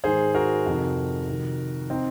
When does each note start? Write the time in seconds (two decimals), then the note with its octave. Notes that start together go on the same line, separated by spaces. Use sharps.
0.04 G#2 D#3 G#4 C5
0.35 F#4 A#4
0.66 F2 C3 D#3
1.28 F2 C3 D#3
1.90 D#3 C4 D#4